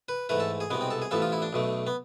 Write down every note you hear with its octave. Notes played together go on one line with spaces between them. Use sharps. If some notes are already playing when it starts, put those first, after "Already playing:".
B4
G#2 E3 A3 B4
A4
G#4
C2 B2 G#3 B3
C4
A4
G#4
A1 A2 F3 B3 A4
F4
E4
D4
B1 B2 A3
B3